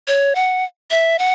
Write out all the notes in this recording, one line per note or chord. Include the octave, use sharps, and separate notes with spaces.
C#5
F#5
E5
F#5